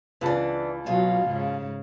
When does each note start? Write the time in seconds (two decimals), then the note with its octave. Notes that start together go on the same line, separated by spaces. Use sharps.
0.21 C#2 E3 D4 A5
0.86 D#2 B2 F#3 F4
1.26 G#2 C#3